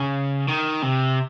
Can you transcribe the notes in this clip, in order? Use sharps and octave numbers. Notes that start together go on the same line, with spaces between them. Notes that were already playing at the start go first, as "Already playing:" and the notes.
Already playing: C#3
D#3
C3